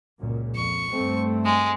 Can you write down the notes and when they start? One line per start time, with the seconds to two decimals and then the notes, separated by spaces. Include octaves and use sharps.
0.19 C#2 F#2 A#2
0.55 F2 C#6
0.92 G2 A3 C4
1.45 G#3